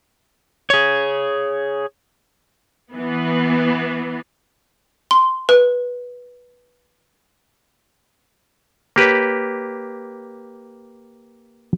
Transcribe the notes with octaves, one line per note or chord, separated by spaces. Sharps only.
G#4 C#5
E3 B3
C6
B4
A#3 G4 B4 C#5